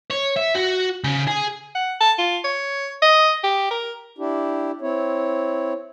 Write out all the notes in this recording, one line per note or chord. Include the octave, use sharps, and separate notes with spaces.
C#5
E5
F#4
C#3
G#4
F#5
A5
F4
C#5
D#5
G4
A#4
D4 E4 G4
C4 E4 C#5